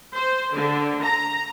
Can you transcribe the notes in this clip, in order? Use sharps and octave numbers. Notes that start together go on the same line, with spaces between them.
C5
D3
A#5